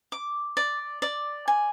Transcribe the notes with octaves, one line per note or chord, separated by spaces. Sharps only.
D6
D5
D5
G#5